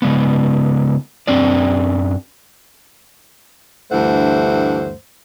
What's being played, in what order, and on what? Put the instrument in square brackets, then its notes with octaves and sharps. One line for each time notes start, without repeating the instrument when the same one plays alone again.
[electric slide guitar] C#3 G#3 B3
F#2 C4 D4 D5
[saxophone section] D2 G2 E3 A3 C5 F#5